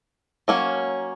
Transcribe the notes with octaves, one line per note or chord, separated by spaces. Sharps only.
F#3 A#3 C#4